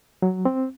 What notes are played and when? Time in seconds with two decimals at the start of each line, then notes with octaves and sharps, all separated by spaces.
0.22 F#3
0.45 C4